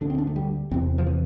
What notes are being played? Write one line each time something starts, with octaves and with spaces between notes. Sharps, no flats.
D2 D3 D4
C4
D4
A3
G3
E2 C3 C4
F3
E3